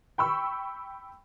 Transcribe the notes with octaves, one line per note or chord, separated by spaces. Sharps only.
G5 B5 C#6 E6